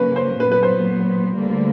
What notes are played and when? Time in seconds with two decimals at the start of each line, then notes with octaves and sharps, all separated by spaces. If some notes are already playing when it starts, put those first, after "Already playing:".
Already playing: C#3 F#3 A#3 C#4 B4
0.16 C5
0.39 A#2 F#3 B3 B4
0.52 B4
0.63 C5
1.35 D2 D3 G3 A#3